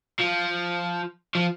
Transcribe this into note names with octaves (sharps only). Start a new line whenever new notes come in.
F3
F3